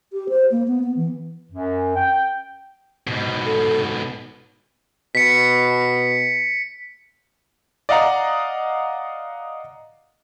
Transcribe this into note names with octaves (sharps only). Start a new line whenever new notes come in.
G4
C5
A#3
B3
B3
E3
F#2
G5
G#2 B2
A4
B2 B6 C#7
D5 D#5 F5 F#5 A#5